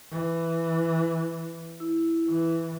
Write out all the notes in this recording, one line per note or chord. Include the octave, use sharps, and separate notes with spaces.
E3
E4
E3